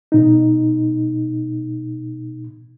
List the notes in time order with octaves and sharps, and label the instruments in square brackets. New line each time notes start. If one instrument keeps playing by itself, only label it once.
[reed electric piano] B2 D#4